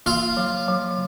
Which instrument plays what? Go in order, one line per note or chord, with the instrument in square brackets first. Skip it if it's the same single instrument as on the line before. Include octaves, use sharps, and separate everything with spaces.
[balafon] A#3 [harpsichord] F4 F5
[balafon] F#3
F#3